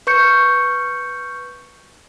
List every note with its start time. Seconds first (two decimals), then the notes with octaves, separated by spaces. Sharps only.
0.07 B4 C#6 G6 C#7